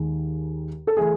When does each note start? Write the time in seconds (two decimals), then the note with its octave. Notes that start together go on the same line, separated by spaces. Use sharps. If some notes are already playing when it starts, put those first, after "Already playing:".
Already playing: D#2 D#3 G#3
0.87 A4
0.97 E3 A3 G#4